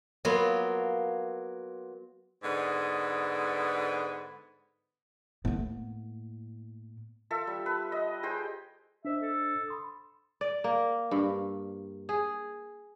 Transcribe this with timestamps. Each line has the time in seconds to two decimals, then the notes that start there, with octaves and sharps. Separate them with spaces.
0.25 F#3 A#3 B3 F4
2.43 G#2 D3 B3
5.45 A2 A#3 B3
7.30 F4 A4 E5
7.47 G3
7.66 B4
7.92 D#5
8.23 G4 G#4 C5 G5
9.05 D4 C5 D#5 E5
9.21 A4
9.68 B5 C6 D#6
10.41 D5
10.64 A#3
11.11 G2
12.09 G#4